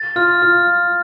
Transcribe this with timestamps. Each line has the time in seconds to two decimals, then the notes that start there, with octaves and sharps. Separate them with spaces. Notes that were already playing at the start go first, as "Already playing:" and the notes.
Already playing: A6
0.16 F4 F6
0.42 F4 F6